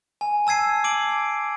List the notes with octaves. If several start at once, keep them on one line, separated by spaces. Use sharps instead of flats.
G#5
A5 E6 G#6 C7 D#7
D6 D7 F#7